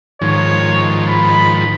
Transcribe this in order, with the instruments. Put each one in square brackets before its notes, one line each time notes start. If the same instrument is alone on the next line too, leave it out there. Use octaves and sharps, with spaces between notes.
[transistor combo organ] G#2 D#3 F3 [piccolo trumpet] C#5
[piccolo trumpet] B5